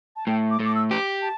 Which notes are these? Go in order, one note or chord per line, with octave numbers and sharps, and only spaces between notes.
A5
A2 G5
D6
A2
D6
E6
G4
D6
A5